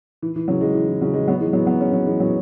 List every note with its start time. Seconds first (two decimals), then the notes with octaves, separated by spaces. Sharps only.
0.22 E3
0.36 E3
0.48 C#3 F#3
0.61 E3 G#3
0.74 E3
0.88 E3
1.01 C#3 F#3
1.14 E3 G#3
1.28 F#3 B3
1.40 E3 G#3
1.53 F#3 B3
1.66 F#3 B3
1.80 G#3 C#4
1.93 F#3 B3
2.06 E3 G#3
2.20 F#3 B3